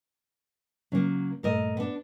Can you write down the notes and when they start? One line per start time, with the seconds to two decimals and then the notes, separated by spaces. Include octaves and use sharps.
0.92 C#3 F#3 A#3 C#4
1.43 G2 A#2 A3 A4 A#4 D#5
1.77 B3 D4